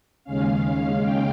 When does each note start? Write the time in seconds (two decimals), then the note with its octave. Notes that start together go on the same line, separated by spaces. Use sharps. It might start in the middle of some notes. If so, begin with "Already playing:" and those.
0.24 D#2 C#3 G#3 C#4 F5
1.01 G5